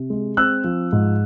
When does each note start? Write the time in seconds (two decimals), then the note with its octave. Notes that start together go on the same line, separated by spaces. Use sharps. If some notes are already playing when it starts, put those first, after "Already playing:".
Already playing: C3
0.10 G#3
0.37 C4 E6 F#6
0.64 F3
0.92 G#2